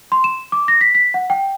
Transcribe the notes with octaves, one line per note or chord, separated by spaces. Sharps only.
C6
E7
D6
A#6
B6
B6
F#5
G5